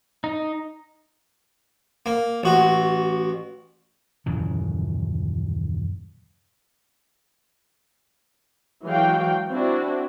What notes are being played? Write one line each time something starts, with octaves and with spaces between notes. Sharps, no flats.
D#4
A#3
A1 F#4
D#1 F#2 C#3 E3
E3 F#3 G#3 F#4 F5 G5
C4 D4 E4 F#4